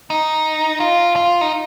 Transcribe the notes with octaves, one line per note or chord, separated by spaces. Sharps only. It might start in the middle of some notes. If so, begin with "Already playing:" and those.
D#4
F4
F4
D#4